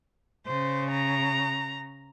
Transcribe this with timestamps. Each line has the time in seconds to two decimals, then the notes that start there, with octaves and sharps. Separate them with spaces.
0.46 C#3 C5
0.91 A#5